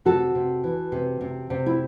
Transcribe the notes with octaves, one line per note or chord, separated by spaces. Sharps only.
C3 F#4 A4
C3
E3
C3
C3
C3
E4